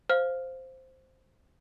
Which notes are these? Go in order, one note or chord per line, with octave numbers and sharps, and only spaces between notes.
C5 F5 F6